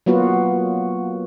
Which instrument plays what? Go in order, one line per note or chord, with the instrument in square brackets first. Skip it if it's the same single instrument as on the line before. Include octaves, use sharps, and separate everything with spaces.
[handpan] F#3 A#3 B3 F4 F#4